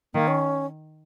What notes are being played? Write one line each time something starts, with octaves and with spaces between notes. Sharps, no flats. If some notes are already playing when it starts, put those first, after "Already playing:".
D#3 A#3
C#4